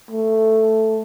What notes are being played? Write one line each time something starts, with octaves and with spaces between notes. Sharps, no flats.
A3